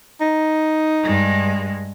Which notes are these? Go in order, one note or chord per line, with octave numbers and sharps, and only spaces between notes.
D#4
G2 G#3